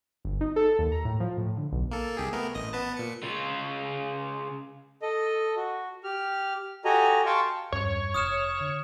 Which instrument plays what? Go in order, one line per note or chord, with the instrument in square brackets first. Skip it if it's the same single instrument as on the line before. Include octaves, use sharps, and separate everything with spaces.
[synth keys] G1
D#4
A4
D#2
A#5
A2
F3
A2
D3
B1
[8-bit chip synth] A#3 A4
C2 G4 G#4
A3 B3 A#4
A1 D#5 A#6
B3 B4 A5
A#2 C#7
[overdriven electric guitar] C#3 F4
[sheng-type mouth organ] A4 D#5
F#4
G4 F6
F#4 G4 A4 D#5 G#5 A#5
F5 G5 A5 C6 C#6
[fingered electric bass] E2 G2 C#4 [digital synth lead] C#5
[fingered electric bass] F1 [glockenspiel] D#6 F6 E7
[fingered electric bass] D3